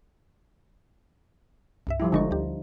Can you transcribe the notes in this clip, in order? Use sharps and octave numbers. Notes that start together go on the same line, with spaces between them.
C2 G2 E5
F3 G3 E4
G1 D3 G#3 D#4 C#6
D2 G4